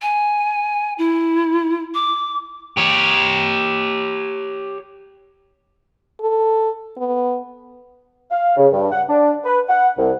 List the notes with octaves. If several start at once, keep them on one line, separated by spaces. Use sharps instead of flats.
G#5
E4
D6
G4 C#5
A4
B3
F5
C#3
G2
F#5
D4
B4
F#5
C2